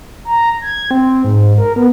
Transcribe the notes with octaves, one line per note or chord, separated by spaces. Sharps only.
A#5
G#6
C4
G#2
A#4
B3